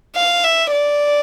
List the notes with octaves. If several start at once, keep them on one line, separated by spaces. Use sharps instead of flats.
F5
E5
D5